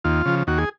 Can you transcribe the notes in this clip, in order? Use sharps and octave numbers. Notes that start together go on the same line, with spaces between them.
D#2 F4
C#3 F3
D#2 F#4
G#4